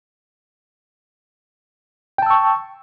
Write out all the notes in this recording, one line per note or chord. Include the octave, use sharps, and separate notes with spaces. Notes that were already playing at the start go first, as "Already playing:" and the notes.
G5 A5 C#6 E6